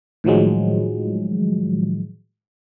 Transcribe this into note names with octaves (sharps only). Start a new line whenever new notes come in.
A2 D#3 F3 F#3 G#3